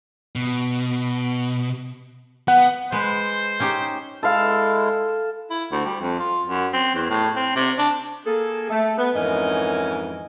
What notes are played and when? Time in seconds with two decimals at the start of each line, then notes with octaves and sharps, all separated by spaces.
0.36 B2
2.48 B3 F#5
2.92 G#3 B4 C5
3.60 C#4 D#4 G4
4.23 G#3 E4 A4 F5
5.50 E4
5.72 D2
5.85 G3
6.01 F2
6.19 F4
6.47 F#2
6.73 C4
6.95 E2
7.10 A2
7.36 C4
7.56 C3
7.78 D4
8.26 A#3 G#4 A4
8.70 A3
8.98 B3
9.15 F2 G#2 E3 C#4 A#4 D#5